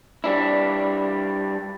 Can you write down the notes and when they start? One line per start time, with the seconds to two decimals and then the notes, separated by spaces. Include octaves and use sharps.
0.24 G3 D4 E4